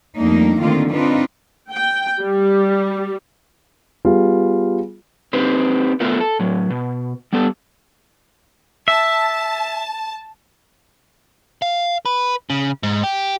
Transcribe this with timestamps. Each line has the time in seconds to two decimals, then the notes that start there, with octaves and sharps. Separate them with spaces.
0.16 F2 G3 A3 A#3 D4 D#4
0.60 D3 D#3 A3 A#3 C4 F4
0.91 C4 D4 D#4 F4 B4
1.70 G5
2.22 G3
4.05 G3 B3 F4 G#4
5.33 C4 D#4 G4 B4 C5
6.00 A3 B3 F4 A4 A#4
6.20 A4
6.39 A2 F#3
6.70 B2
7.33 G3 B3 G4 A4
8.88 E5 A5
11.62 F5
12.06 B4
12.50 C#3
12.83 G#2
13.04 G4